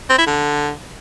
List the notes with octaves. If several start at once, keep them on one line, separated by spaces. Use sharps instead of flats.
C4
E4
D3